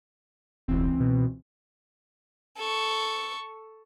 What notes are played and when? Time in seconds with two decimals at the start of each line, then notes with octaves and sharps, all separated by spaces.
0.68 E1 C#2 E3 C4
1.00 B2
2.57 A4 C#6